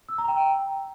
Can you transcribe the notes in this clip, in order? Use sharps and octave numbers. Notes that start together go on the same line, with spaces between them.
E6
A#5
G5